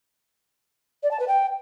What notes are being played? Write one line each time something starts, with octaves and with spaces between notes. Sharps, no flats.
D5
A5
B4
G5